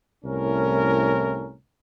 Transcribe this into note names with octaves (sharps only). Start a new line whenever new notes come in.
C2 A2 C#4 A#4